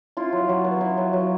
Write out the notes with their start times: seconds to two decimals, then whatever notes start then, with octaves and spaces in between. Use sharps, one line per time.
0.17 E4 F4
0.33 F#3
0.49 F#3
0.64 B3
0.81 E4
0.97 F#3
1.13 F#3